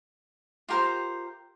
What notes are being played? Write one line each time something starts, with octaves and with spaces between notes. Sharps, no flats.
F4 G4 A#4 C5